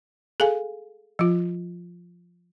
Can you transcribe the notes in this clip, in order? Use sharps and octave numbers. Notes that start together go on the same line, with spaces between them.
G#4 A4 F5 G#5
F3 F4